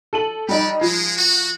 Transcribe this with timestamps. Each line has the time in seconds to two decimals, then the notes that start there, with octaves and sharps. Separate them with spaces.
0.13 A4 D#7 F#7
0.49 G3 D#4 F#4 G4 D5
0.81 F3 G#3
1.17 F#4